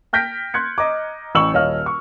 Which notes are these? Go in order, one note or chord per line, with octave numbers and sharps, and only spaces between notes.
G5 F6 G6 A#6 B6 D7
C6 F#6 G#6 C#7
D#5 A#5 D6
A1 G5 C#6 E6 F#7
D#1 C#5 D#5 F5 F6
C#6 F6